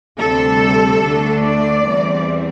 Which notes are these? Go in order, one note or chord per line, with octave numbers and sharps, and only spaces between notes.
D2 C3 G3 C4 A4
D2 D3 A3 D4
D5
E2 E3 G3 C4